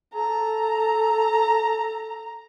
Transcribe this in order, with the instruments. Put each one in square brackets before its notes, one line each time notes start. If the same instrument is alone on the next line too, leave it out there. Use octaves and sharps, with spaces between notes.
[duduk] A4 [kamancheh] A#5